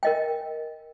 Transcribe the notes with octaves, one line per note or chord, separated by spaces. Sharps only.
A#4 D#5 G5